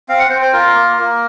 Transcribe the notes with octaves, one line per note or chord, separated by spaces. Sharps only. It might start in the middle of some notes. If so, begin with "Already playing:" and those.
C4 F5
F#5
C4 C5
C5
F4 A#4
A#3
A#3